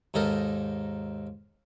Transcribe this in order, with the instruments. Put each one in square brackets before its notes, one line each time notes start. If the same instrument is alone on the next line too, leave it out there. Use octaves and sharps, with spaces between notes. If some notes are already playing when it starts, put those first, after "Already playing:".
[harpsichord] D#2 G#2 D#4 A4 A#4